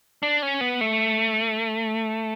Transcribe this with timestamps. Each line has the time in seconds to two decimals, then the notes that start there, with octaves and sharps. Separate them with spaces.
0.23 D4
0.42 C#4
0.61 B3
0.81 A3